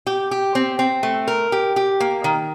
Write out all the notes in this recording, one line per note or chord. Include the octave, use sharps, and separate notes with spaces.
G4
G4
C4
C4
A3
A#4
G4
G4
A#3
D#3